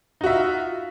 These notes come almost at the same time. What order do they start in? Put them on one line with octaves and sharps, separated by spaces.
D#4 F#4 E5 F4